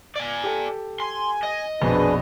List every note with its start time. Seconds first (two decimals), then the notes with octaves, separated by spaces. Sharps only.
0.16 D5 G#5
0.44 G4 A4
1.00 G#5 C6
1.43 D#5
1.82 A#1 F2 B2 D4 G#4 B4